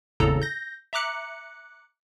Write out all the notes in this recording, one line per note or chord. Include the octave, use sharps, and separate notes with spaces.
G#1 E2 A2 C#3 A4 A#5
G6 A#6
E5 A#5 D6 F#6 C#7